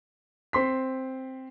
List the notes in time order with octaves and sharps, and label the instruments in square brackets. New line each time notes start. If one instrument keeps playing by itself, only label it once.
[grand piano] C4 C6 B6